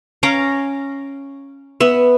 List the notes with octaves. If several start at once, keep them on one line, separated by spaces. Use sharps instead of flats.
C#4 F5 A#5 D6
B3 E5